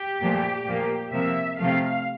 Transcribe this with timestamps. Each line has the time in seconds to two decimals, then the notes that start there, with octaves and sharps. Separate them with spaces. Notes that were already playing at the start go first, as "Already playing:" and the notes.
Already playing: G4
0.21 A#2 F3 A3
0.66 A#2 F3 A#3
1.12 C3 F3 A#3 E5
1.58 C3 F3 A3 F5